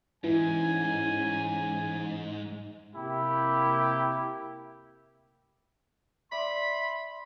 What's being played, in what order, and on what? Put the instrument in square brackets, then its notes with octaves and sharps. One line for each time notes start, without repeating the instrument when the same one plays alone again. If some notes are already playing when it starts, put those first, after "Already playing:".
[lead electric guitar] G#2 [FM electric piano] E3 [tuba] C#4 [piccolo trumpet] G#5
[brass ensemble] C3 A#3 G4 [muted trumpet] E4
[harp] D5 [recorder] E5 [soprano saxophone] B5 [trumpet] C6